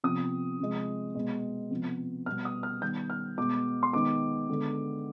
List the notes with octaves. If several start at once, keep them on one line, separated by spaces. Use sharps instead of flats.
C3 F3 B3 D#6
C3 F3 G#3
B2 G#3 B3
C3 F3 B3
B2 G3 B3 F6
D#6
F6
D#3 G3 B3 G6
F6
B2 G#3 B3 D6
C6
D#3 G#3 B3 D6
D3 G#3 B3